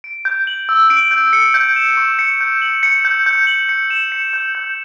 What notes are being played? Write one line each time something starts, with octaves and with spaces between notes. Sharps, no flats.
D7
G6
F#7
E6
D7
G6
C#7
G6
E7
C#6
C#7
G6
F#7
C#7
G6
G6
F#7
C#7
E7
C#7
G6
G6